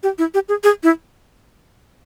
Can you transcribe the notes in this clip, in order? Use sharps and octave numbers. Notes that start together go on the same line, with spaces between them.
G4
E4
G4
G#4
G#4
E4